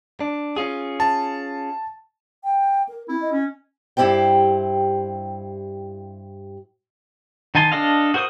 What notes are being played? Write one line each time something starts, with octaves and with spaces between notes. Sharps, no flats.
D4
C#4 F4 G#4
A5
G5
A#4
C4 E4
D#5
C#4
G2 E4 G4 C5 G5
D#3 D#4 G#5 A5 C6
D4 A4 D#5 F5
F#4 A#4 C5 C#6 D#6